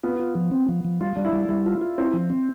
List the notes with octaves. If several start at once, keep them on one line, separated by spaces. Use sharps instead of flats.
B3 F4
F4
F3
C4
F3
F3
G3 F4
G3 D4
E4
G3
G3 E4
F4
F4
C4 E4
F3
C4